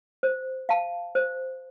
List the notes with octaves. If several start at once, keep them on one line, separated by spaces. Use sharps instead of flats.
C5
F5 A5
C5